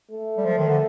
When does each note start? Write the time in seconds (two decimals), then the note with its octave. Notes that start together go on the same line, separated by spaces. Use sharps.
0.10 A3
0.38 G3
0.45 F3
0.58 D#3
0.69 D3